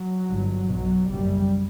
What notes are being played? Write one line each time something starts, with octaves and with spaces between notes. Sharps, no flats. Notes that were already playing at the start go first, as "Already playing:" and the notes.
Already playing: F#3
G1 G2
B1 B2 F#3
F#1 F#2 G3